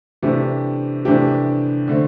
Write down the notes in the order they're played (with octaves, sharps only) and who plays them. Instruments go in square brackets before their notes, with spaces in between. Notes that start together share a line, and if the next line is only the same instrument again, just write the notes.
[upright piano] C3 E3 A3 D4 G4
C3 E3 A3 D4 G4
D3 A3 C4